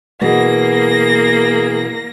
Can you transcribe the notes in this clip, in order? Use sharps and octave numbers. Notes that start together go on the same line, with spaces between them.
B2 E3 A#3 G#4 A#6